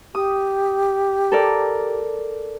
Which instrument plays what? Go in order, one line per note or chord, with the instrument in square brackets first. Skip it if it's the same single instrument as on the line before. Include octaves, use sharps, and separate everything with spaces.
[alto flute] G4 [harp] D#6
[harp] A4 A#4 D5